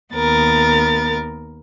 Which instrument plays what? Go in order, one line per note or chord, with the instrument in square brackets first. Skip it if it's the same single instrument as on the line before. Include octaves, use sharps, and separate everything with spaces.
[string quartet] D#2 B3 A#4 A6